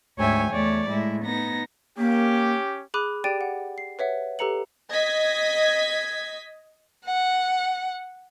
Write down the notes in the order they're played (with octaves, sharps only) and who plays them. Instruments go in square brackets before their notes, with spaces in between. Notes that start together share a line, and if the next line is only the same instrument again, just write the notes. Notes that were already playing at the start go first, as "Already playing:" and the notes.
[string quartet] D2 G#2 C#5 E5 G5 G#5
E2 A3 C#5 D5
A2 G#3 E4
B3 D#4 A#6
[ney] A#3 [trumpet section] C#4 G4
[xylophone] G#4 B5 D6 F#6 D#7
G4 D5 G5 A6 D7 D#7
F#5
C7
B4 C#5 E5 F#5
G4 A4 B4 A#5 C#7 F#7
[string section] D#5 G#6 B6
[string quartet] F#5